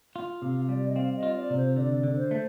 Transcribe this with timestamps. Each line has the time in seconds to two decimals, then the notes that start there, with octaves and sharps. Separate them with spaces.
0.16 F4
0.42 C3 F5
0.69 G3 D5
0.89 D#5
0.96 C4 F5
1.17 D#5
1.23 F4
1.37 D5
1.50 C3
1.57 C5
1.76 D3 D5
2.03 D3
2.17 C5
2.31 A3